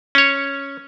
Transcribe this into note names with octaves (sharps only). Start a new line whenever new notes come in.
C#4 C#5